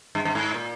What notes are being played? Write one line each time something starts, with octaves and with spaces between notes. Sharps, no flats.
G2
G2
G#2
A#2